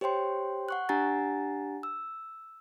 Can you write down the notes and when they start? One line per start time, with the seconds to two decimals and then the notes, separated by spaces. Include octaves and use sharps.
0.01 G4 C5 C#5 G5 C6
0.69 F#5 C#6 F#6
0.89 D4 G4 F#5 G#5 A#5 A6
1.83 E6